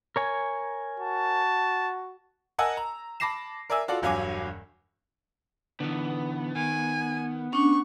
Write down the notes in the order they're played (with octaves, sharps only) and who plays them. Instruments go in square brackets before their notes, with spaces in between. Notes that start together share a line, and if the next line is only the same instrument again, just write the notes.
[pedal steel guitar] A#4 C#5 G#5
[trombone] F#4 [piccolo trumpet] A5
[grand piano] A#4 D#5 F#5 G#5 A5 E6
A#5
A5 B5 D6 A#6 C7 E7
A#4 D5 E5 G#5 E6
F4 F#4 A4 D5
E1 G2 F#3 F5 G#5 D6
[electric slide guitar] D3 E3 [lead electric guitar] B3
[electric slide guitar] D#3 [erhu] G#5
[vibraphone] C#4 D4 [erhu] C#6